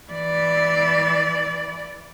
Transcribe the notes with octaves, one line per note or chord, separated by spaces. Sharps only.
E3 D5